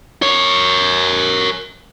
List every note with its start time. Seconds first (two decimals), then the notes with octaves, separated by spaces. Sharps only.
0.22 A#4 C#5